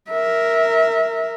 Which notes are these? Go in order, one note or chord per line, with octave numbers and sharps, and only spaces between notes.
A#4 E5